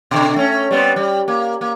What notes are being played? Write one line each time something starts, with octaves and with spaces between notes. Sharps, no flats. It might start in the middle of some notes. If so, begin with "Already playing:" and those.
B2 D3
A3 C#4
G3 B3 C4
G3
A#3
A#3